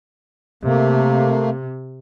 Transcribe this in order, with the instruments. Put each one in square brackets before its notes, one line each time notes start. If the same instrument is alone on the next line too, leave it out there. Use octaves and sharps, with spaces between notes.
[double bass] C3 [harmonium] A3 A#3